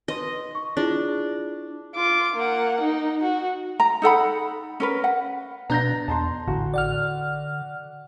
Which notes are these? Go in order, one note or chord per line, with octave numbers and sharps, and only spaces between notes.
D#4 B4 D#5 C6
C#6
D4 E4 F4 G#4
F4 D6
A#3 F#5
D#4
F#4
A#5
D#4 A4 F#5 B5
C#4 A#4 B4
F#5
B2 B3 D4 A#5 G6 A#6
E2 A5 A#5 C6
A1 D3 F#4
D5 F#5 F6